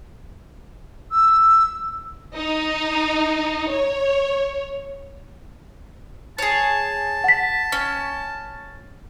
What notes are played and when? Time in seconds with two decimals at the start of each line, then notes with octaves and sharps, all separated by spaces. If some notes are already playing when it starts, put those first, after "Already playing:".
1.12 E6
2.36 D#4
3.71 C#5
6.38 G#4 C#5 A5
7.24 F#5 B6
7.72 C#4